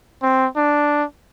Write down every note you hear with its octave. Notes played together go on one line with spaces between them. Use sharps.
C4
D4